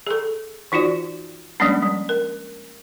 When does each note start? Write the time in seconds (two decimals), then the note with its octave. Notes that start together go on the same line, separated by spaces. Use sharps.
0.07 G#4 A4
0.72 E3 D#4 F4 F#4 D5
1.60 F3 G3 G#3 A#3 C#4 D4
1.82 G3
2.09 A#4